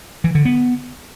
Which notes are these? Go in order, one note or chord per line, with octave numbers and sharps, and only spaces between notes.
E3
D3
B3